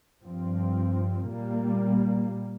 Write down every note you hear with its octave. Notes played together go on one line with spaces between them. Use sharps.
G2 F3 C4
A#2 G3 A#3